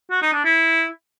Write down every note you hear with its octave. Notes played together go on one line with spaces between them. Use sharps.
F#4
D#4
D4
E4